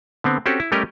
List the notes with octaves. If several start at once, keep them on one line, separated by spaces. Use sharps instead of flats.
D3 B3 C4
C4 C#4 F#4 G4 A4
E4
G3 A3 C#4 G4 A#4 D#5